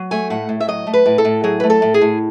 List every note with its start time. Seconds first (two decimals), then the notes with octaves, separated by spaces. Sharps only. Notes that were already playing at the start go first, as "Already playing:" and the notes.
Already playing: F#3
0.11 A3 G#5
0.30 A2 F#5
0.49 A2
0.60 E5
0.68 F#3 D#5
0.87 A3
0.93 B4
1.06 A2
1.18 A4
1.25 A2
1.44 F#3 G#4
1.60 A3 B4
1.70 A4
1.82 A2
1.94 G#4
2.01 A2